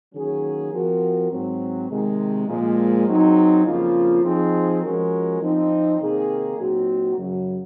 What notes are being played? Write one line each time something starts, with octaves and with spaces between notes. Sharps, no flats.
D#3 F#3 A#3 C#4 G#4
F3 C4 F#4 A#4
G#2 F#3 C4
C3 D#3 G#3
A#2 F3 G#3
F#3 C4 D#4 G#4
F2 C#3 F3 A#3 F4
F3 C4 D#4 G#4
F3 G#3 C#4 F#4 A#4
F3 C4 D#4
C3 D#3 A#3 D#4 G#4
A#2 F#3 C4 D#4 F#4
F#2 C#3 F#3